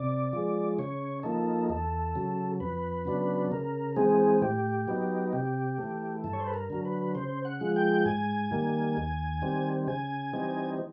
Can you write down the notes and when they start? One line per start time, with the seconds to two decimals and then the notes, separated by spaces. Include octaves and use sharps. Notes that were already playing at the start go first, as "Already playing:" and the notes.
Already playing: C3 D5
0.33 F3 G#3
0.79 C#3 C#5
1.23 F3 A#3 D#4 A4
1.69 E2 A4
2.15 C#3 F#3
2.60 F2 B4
3.05 C#3 F#3 B3 D4
3.52 C#3 A#4
3.96 E3 G#3 C4 G#4
4.42 A2 G4
4.88 F#3 B3 D#4
5.33 C3 G4
5.78 E3 A3
6.24 G2 A4
6.33 C#5
6.40 C5
6.47 B4
6.54 A#4
6.70 D3 F#3
6.85 B4
7.15 C#3 C5
7.45 F#5
7.61 F3 G#3
7.76 G5
8.06 G#2 G#5
8.51 D#3 G3 A#3
8.97 D#2
9.42 D#3 G3 C4
9.87 C#3 G#5
10.33 E3 G3 C4 D#4